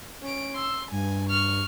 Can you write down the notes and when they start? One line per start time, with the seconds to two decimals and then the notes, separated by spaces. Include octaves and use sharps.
0.22 C#4 D7
0.55 C6 E6
0.91 G2 G#5
1.30 C#6 F6